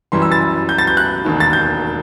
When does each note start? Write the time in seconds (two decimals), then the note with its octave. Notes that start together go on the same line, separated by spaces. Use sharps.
0.12 F#2 E3 G3 C6
0.22 E6
0.32 A6
0.69 G6
0.78 A6
0.87 G6
0.97 F#6
1.25 E1 D#2 D#3
1.40 A6
1.53 G6